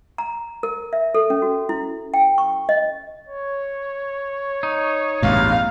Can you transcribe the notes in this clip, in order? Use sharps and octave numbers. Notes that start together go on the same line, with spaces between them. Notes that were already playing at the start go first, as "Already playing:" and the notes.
A#5
A#4
E5
A4
C#4
F#4
E4
G5
C#6
D#5
C#5
D#4
A1 E2 G2 F5